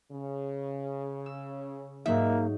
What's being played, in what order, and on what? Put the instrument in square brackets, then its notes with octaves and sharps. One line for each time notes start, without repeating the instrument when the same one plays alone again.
[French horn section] C#3
[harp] E6
[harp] G#2 F#3 D#4 [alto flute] A#3 [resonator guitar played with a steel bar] E5